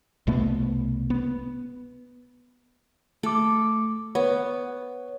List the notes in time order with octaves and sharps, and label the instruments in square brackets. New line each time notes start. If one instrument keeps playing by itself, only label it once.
[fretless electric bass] C2 B2 A3 B3
B3
[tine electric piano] A3 D6 [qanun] A4
[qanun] B3 [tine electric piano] C#5